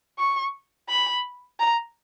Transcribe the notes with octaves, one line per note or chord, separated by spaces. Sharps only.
C#6
B5
A#5